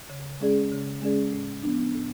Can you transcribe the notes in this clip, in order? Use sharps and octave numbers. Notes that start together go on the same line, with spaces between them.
C#3
G#3 C#4 G#4 D5
C#3
G#3 C#4 G#4 D5
A2
F3 B3 D4
A2